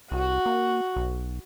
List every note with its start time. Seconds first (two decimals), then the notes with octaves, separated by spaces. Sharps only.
0.11 C2 F#4
0.46 A#3
0.96 B1